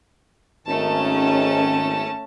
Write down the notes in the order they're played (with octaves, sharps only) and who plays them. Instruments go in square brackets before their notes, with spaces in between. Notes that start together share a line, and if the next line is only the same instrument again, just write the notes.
[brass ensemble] G#1 D#3 [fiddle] A3 A5 [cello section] C#4